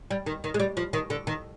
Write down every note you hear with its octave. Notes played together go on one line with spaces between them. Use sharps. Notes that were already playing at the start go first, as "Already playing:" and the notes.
G3
D#3
D#3
G#3
G3
F3
D#3
D3
D#3